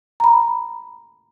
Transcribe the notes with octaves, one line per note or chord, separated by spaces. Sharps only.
A#5 B5